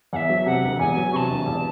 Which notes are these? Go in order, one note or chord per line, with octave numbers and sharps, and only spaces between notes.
E2 E5 F#5
F#3
C3 F#5
E1
E2 G#5
F#3
C3 A5 C#6
E1
E2